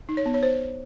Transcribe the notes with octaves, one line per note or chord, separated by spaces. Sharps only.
D#4
C#5
B3
C#5
C5